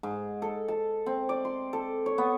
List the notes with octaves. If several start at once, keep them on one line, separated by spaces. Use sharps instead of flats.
G#2
A4
A5
C4
D5
C6
A4
C#5
B3